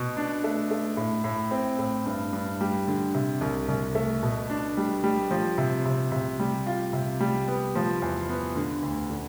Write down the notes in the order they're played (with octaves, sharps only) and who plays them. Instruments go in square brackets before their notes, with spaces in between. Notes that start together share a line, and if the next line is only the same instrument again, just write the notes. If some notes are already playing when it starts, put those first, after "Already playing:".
Already playing: [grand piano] B2
D4
A3
A3
A2
A2
C4
A2
G2
G2
G3
D3
C3
C2
C2
A3
B2
D4
G3
G3
F3
C3
C3
C3
G3
F4
C3
G3
B3
F3
E2
B3
D3
D2
D3